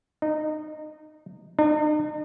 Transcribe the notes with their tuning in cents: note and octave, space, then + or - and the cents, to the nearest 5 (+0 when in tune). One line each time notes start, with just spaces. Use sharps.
D#4 -20
D#4 -45